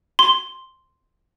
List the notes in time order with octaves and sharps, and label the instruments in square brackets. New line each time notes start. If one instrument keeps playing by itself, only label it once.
[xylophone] C6